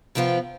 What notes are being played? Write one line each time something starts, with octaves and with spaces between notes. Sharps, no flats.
C3 F3 B3 F4 G5